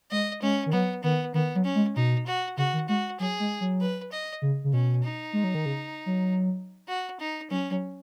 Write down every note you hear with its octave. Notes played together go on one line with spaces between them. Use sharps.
G#3 D#5
G#3 C#4
D#3
F#3 B3
D#3 B3
D#3 B3
F#3
C#4
G#3
B2 D#4
F#4
C#3 F#4
D#3
G#3 F#4
F#3 G#4
G#3
F#3
B4
D#5
C#3
C#3
B2 C#4
D#4
G#3
F#3
D#3
C#3
F#3
F#4
D#4
F#3 C#4
F#3